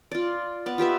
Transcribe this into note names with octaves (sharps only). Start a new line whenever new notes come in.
F4 D5
B3 D5
F4 G4 B4 E5